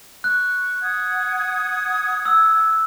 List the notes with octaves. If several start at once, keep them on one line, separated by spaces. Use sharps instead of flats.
C#6 F#6
F#5 D#6 G#6
E6